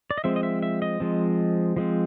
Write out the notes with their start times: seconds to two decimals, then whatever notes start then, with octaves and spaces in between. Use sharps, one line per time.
0.11 D5
0.18 D#5
0.24 F3 G#3 C4 E5
0.36 D#5
0.43 E5
0.63 E5
0.82 D#5
1.00 F3 G#3 C4
1.77 F3 G#3 C4